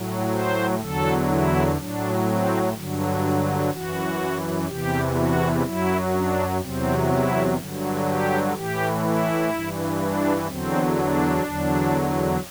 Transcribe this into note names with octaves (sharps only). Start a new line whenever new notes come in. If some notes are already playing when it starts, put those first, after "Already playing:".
Already playing: A2 F#3
C5
E2 D3 F#3 A4
E4
A2 F#3 D4
C4
G2 D3 F#3
F#2 E3 F#4
E2 C3 E3 G4
F#4
F#2 F#3 E4
D4
E2 C3 F#3 C4
E4
G2 D3 F#3
G4
A2 E3 G4
E4
G2 E3
D4
E2 D3 F#3 C4
D4
E2 D3 F#3